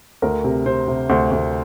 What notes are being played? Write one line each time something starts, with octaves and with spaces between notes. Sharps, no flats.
D2 A#4
C3
C3 C5
C3
D2 C5
D2